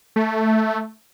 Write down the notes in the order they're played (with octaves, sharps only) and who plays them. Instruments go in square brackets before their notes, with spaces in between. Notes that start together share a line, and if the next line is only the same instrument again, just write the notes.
[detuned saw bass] A3